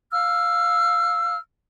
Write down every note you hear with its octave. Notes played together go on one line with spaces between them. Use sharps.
F5 E6 F6